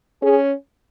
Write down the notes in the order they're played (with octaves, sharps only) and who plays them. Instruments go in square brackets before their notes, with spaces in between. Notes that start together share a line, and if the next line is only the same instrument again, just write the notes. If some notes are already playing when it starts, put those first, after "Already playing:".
[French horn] C#4 [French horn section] G#4